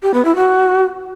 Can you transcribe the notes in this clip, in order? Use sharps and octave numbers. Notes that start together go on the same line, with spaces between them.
G4
B3
E4
F#4